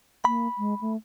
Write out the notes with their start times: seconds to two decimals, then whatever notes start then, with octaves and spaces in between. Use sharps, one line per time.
0.25 A#3 B5
0.58 G#3
0.81 A3